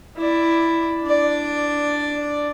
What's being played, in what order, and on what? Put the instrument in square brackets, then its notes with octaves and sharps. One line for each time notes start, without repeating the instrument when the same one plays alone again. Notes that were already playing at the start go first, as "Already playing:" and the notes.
[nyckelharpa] E4 D5
D4 D5